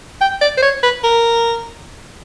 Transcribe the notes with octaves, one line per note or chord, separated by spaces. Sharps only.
G5
D5
C5
C#5
B4
A#4